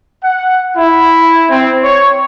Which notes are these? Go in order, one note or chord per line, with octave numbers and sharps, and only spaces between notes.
F#5
E4
C4
C#5